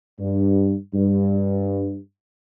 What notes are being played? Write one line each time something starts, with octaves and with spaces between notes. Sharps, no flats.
G2
G2